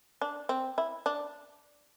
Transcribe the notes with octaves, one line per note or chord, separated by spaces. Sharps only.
D4
C4
E4
D4